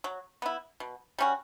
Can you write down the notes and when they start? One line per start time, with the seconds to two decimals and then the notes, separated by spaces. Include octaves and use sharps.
0.04 F#3
0.42 B3 E4
0.80 B2
1.18 G3 C#4 F#4